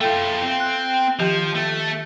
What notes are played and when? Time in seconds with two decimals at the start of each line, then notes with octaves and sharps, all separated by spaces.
0.01 A3 F4 A4 G5
0.42 C4
0.60 F#6
1.20 D#3 F3 G4
1.55 A3